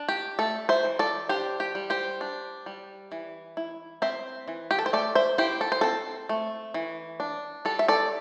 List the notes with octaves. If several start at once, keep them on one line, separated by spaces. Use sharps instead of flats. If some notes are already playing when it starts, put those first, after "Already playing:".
Already playing: D4
G4
A3 A4
C5 E5
E3
A4 D5
D4 G4 C5
G4
G3
G4 C5
D4
G3
E3
E4
C4 C5 E5
E3
G4
A4
C5
A3 A4 D5
C5 E5
E4 G4 C5
A4
C5
C4 A4
A3
E3
D4
G3 A4
E5
A4 D5